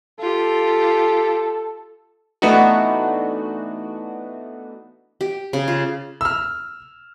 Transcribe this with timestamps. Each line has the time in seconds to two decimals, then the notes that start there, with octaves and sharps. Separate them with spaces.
0.19 F4 G4 A4
2.42 E3 A3 B3 D4 D#4 F#4
5.21 G4
5.53 C#3
5.68 F4
6.21 E6 F6